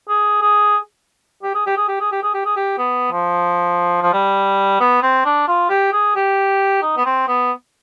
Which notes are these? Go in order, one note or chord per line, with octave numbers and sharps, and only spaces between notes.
G#4
G#4
G4
G#4
G4
G#4
G4
G#4
G4
G#4
G4
G#4
G4
B3
F3
F3
G3
B3
C4
D4
F4
G4
G#4
G4
D#4
B3
C4
B3